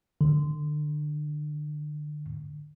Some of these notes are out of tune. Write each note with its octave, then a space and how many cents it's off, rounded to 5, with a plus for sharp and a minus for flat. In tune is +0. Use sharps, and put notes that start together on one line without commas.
D3 +30